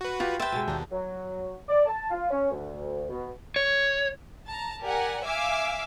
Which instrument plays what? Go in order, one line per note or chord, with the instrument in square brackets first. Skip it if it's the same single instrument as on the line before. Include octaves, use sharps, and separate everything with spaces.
[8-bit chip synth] F#4 B4
[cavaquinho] F4 [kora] G4
[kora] C4 B4 [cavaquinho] E5 G5 [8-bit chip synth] A6
[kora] B2 G#3
[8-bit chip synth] D#2 [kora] D4 D#4
[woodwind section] F#3
D5
A5
F4
C#4
D2
B2
[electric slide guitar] C#5
[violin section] A5 A#5
G4 A#4 D5 F#5 G#5
E5 F5 G#5 D6 E6